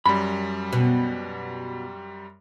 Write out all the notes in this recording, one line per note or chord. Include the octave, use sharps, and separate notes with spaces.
F#2 G3 B5
B2